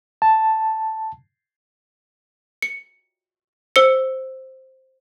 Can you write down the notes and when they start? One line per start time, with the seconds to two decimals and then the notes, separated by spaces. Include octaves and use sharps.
0.22 A5
2.62 C#7
3.76 C5 E6 C#7